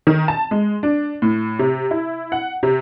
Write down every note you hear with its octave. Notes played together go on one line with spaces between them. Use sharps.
D#3
A5
G#3
D4
A2
C3
E4
F#5
C3